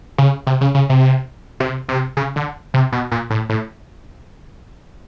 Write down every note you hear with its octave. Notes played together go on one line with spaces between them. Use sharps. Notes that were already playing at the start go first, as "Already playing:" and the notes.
C#3
C3
C#3
C#3
C3
C3
C3
C#3
D3
C3
B2
A#2
A2
A2